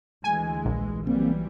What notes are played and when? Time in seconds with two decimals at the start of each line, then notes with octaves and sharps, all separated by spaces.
0.24 D2 E3 G#3 G#5
0.65 A#1
1.07 E3 F#3 G3 A#3 C4